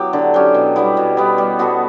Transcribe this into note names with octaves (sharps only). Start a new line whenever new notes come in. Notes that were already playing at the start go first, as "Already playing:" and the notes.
Already playing: F#3 B3 E4 G4
D3
F#3 C#4 G4
B2
G3 B3 E4
B2
G3 B3 E4
G3
B3 F#4 A4